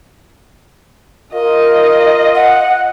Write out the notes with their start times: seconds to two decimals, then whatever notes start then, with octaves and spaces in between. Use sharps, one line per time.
1.34 F4 A#4 D#5
2.35 F#5